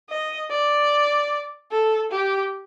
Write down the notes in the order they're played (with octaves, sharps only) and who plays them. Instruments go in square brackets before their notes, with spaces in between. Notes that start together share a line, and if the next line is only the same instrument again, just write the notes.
[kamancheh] D#5
D5
A4
G4